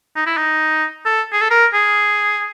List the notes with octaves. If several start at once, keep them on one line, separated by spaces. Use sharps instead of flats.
D#4
E4
D#4
A4
G#4
A4
A#4
G#4